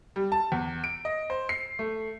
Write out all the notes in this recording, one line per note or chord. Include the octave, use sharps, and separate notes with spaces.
G3
A5
E2
D7
D#5
C5
C7
A3